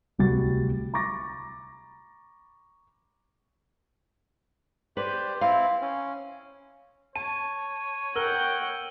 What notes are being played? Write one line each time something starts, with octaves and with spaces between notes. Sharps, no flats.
D1 C2 G3 F#4 A6
A#5 B5 C#6 D6 A6 A#6
G4 B4 C5 D5
C4 E4 F5
C#4
C#5 A5 D#7
A#4 F#5 G5 E6 G7